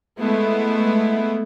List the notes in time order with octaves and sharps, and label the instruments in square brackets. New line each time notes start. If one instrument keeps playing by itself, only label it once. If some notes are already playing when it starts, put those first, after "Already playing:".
[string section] G#3 A3 B3 E4